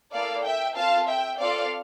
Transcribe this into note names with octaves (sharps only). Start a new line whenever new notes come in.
A#3 E4 A4 D5 F5
E5 G5
C4 F4 A4 F5 A5
E5 G5
C4 F4 A4 D5 F5